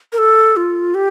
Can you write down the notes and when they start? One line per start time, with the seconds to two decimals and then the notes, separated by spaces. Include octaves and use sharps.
0.13 A#4
0.18 A4
0.57 F4
0.95 G4